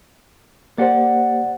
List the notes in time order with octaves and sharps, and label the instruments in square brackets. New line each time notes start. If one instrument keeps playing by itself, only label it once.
[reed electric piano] A#3 G4 C5 [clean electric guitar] D5 F#5